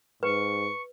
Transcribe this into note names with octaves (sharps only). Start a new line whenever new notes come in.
G#2 B4 C#6